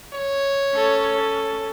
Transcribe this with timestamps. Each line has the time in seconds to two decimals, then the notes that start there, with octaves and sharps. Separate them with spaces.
0.14 C#5
0.72 C#4 A4